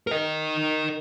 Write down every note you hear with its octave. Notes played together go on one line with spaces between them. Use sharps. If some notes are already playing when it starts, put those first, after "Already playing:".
A#4 D#5